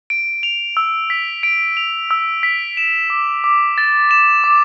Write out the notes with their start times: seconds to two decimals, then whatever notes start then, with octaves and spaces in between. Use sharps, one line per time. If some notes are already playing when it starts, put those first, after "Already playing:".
0.10 D7
0.43 F7
0.77 E6
1.10 B6
1.43 D7
1.77 F7
2.11 E6
2.43 B6
2.77 E7
3.10 D6
3.44 D6
3.78 A6
4.11 E7
4.44 D6